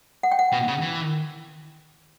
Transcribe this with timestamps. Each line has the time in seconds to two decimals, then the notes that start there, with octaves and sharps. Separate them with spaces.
0.23 F#5
0.32 G5
0.39 F#5
0.52 B2
0.68 C#3
0.82 E3